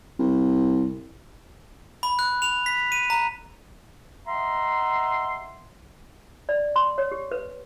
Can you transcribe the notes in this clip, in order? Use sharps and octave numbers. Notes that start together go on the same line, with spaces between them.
C2
B5
F#6
F7
B6
D#7
A#5
D#5 E5 F#5 A#5 C6
D5
C6
C#5
G4
B4